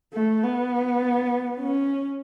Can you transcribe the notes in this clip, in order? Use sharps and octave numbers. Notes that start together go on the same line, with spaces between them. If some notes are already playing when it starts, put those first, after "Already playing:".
A3
B3
C#4